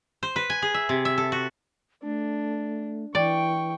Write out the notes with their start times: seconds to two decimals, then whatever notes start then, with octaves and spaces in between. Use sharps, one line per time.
0.23 C5
0.36 B4
0.50 G#5
0.62 G#4
0.74 E5
0.89 C3
1.05 E5
1.18 A4
1.32 F#4
2.03 A3 D4
3.15 E3 D5 G5 C#6